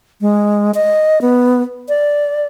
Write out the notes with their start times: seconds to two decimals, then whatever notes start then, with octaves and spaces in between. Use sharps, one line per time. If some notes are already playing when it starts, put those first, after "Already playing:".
0.21 G#3
0.74 D#5
1.22 B3
1.89 D5